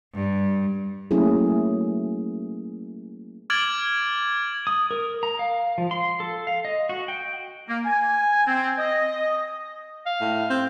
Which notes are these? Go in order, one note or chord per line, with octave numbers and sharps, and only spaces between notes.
G2
F#3 A3 A#3 C#4 E4 G#4
D6 F6 G#6 A6 D7 F#7
D#6
A#4
A#5
F5
F3
C6
A4
F5
D#5
F#4
G5
A#3
G#5
C4
D#5
F5
A2
C4